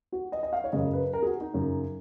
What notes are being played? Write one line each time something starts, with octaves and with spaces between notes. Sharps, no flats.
F#4
D#5
D#5
F5
C#5
F#2 C#3 D#5
B4
A#4
G#4
F#4
D#4
F#2 C#3